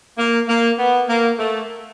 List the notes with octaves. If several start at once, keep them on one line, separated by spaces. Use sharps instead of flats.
A#3
A#3
B3
A#3
A3